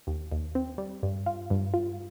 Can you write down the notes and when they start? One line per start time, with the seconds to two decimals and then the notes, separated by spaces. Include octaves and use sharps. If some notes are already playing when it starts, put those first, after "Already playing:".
0.07 D#2
0.32 D#2
0.55 C4
0.78 G3
1.03 G2
1.26 F4
1.50 G2
1.74 F4